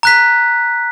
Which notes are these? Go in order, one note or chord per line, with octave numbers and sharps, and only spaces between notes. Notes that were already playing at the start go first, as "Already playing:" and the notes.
A#5 F#6 B6